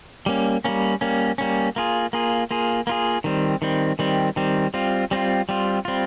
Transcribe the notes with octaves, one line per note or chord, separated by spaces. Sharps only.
G3 A#3 C#4
G3 A#3 C#4
G3 A#3 C#4
G3 A#3 C#4
A#3 F4 G#4
A#3 F4 G#4
A#3 F4 G#4
A#3 F4 G#4
D#3 G3 C4
D#3 G3 C4
D#3 G3 C4
D#3 G3 C4
G3 C4 F4
G3 C4 F4
G3 C4 F4
G3 C4 F4